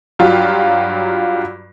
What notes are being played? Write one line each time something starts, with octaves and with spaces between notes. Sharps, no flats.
G2 F#3 F4 G4